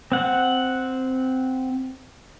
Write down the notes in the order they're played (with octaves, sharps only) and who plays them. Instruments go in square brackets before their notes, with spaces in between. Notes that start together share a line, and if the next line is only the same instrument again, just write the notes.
[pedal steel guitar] C4 F#5